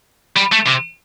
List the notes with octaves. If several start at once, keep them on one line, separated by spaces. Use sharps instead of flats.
G3
A3
C3